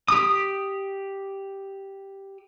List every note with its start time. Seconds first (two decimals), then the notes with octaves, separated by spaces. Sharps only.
0.08 G4 D#6